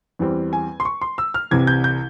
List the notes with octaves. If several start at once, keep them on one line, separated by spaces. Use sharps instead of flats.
E2 E3 G3 C4
G#5
C6
C#6
C6
E6
F6
C2 C3 E3 G#6
G6
G6